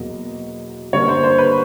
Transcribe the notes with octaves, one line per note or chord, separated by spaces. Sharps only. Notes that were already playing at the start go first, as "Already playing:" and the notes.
Already playing: E2 B2 F#3 A#3 D#5
G2 D3 G3 A#3 C#5
C5
C5
B4